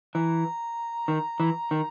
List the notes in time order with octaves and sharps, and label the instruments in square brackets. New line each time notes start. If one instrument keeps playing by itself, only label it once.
[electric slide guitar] E3 [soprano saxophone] A#5
[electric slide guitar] D#3
E3
D#3